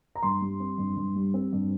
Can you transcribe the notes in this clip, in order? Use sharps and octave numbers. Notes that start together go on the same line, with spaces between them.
A#5
G2 C6
G3
C4
G2
G2
G3
C4
G2